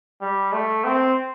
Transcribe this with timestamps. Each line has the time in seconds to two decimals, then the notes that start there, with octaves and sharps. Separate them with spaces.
0.21 G3
0.53 A3
0.84 C4